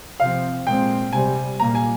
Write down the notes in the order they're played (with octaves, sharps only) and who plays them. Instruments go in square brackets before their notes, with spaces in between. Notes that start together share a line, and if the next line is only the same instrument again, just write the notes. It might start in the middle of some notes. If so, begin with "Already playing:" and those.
[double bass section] C3 F3 C4 [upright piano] F5
[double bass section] A#2 G#3 C4 [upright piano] G5
[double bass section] C3 G3 C4 [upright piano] G#5
[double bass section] A#2 G3 A#3 [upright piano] A#5
[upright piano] G#5